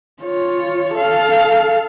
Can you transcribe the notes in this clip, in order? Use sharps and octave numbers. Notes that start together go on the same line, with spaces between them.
F4 C#5
A4 F5